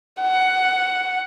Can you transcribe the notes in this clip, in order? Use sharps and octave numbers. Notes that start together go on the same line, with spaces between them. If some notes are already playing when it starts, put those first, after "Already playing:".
F#5